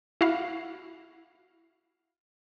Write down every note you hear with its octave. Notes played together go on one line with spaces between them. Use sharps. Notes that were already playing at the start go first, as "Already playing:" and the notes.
E4 F#4 F5